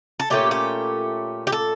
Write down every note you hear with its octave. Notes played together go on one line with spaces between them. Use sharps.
A4
A#2 A3 C#4 G4
G4
G4
A4